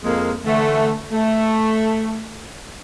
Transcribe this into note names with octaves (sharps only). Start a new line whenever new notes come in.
F2 G#3 A#3
D3 E3 A3
A3